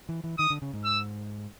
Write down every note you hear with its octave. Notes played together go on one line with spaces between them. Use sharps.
E3
E3
D#3 D#6
D3
C#3
G#2
E6